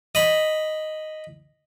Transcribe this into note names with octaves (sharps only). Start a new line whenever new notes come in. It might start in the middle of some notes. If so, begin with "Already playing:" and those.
D#5 B5